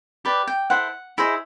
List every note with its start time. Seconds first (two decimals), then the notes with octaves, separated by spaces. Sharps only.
0.25 G4 B4 D5
0.47 G5
0.70 E4 A4 C5 F#5
1.18 E4 G#4 C5 D#5